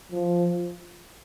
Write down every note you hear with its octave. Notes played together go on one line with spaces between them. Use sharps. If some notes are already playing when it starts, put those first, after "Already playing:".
F3